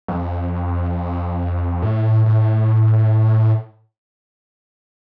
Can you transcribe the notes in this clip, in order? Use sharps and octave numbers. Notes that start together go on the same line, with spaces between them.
F2
A2
A2